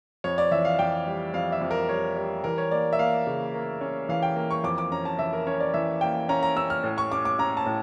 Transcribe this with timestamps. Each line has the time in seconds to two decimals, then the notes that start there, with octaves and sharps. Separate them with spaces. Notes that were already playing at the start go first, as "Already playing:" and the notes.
0.24 F2 C#5
0.38 D5
0.51 E3 E5
0.65 F5
0.79 F2 G5
1.07 G3
1.34 F2 F5
1.52 E5
1.61 F2
1.71 A#4
1.89 G3 C#5
2.16 G3
2.44 E3 A#4
2.58 C#5
2.71 A#3 D5
2.93 E5
2.99 A#3 F5
3.27 C#3
3.54 A#3
3.81 C#4
4.09 E3 F5
4.23 G5
4.36 A#3
4.51 C#6
4.64 F2 D6
4.78 D6
4.92 C#4 A#5
5.05 A5
5.19 E3 E5
5.33 A#4
5.47 C#4 C#5
5.60 D5
5.74 E3 E5
6.01 A#3 G5
6.29 C#4 A#5
6.43 A#5
6.56 C#4 E6
6.70 F6
6.84 A2
6.98 C#6
7.12 C#4 D6
7.25 D6
7.39 C#4 A#5
7.57 A5
7.66 A2